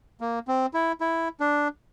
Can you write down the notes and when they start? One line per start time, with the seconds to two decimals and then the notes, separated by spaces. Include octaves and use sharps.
0.21 A#3
0.48 C4
0.74 E4
1.01 E4
1.40 D4